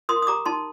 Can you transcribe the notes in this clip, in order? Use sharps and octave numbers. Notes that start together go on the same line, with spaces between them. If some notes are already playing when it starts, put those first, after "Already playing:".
A#4 C6 D#6
D#6
G4 A#5 D6
D#4 A5 C6